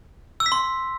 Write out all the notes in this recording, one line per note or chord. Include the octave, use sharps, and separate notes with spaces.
E6
B6
C6